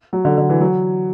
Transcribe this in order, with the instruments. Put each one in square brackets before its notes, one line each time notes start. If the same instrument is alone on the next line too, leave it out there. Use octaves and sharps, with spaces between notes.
[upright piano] F#3
D3
D3
E3
F#3